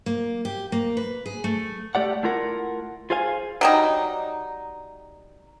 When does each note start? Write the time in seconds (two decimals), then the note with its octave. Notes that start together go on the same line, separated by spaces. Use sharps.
0.06 A#3
0.45 G4
0.72 A#3
0.97 B4
1.26 G#4
1.44 A3
1.95 A3 G4 D5 F#5
2.23 A3 E4 F4 A#4 F#5
3.10 F4 G#4 C5 F5 G#5
3.61 F#3 G3 D#4